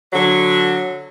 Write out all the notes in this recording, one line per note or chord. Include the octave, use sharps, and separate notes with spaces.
D3 F#3